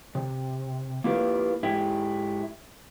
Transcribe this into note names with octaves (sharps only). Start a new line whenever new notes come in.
C3
A#3 E4 F4 G4 A#4 B4
G#2 E4 G4